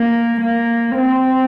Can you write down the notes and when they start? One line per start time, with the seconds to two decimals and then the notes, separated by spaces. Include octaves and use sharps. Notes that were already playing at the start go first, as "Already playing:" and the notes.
Already playing: A#3
0.40 A#3
0.95 C4